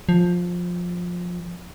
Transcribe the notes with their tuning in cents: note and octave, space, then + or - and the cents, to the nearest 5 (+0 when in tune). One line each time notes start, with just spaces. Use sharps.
F3 +15